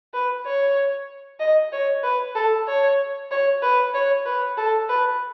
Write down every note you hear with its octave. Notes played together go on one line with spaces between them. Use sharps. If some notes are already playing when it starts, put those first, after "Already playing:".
B4
C#5
D#5
C#5
B4
A4
C#5
C#5
B4
C#5
B4
A4
B4